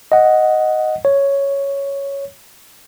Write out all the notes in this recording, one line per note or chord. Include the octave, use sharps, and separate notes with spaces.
D#5 F#5
C#5